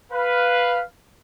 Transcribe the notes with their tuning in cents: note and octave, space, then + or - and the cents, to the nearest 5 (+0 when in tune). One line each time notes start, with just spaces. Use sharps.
B4 +0 F5 +0